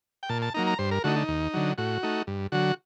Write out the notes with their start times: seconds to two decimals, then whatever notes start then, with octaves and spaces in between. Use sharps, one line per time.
0.23 G5
0.29 A#2 A5
0.42 A5
0.54 F#3 A#3 D#4 A#5
0.67 A#5
0.79 G2 C5
0.91 A#4
1.04 D3 A3 D#4 F#4
1.16 D#4
1.28 D#2
1.54 D3 F#3
1.78 A2 F#4
2.03 A3 D#4
2.27 G2
2.52 D3 F#3 F#4